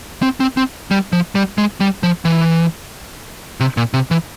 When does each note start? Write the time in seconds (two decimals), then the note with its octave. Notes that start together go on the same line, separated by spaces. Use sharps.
0.23 C4
0.40 C4
0.57 C4
0.91 G3
1.13 F3
1.35 G3
1.58 G#3
1.80 G3
2.03 F3
2.25 E3
3.60 C3
3.77 A#2
3.94 C3
4.11 E3